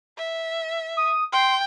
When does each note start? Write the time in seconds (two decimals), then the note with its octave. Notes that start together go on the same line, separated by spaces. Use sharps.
0.18 E5
0.97 D#6
1.33 G5 C6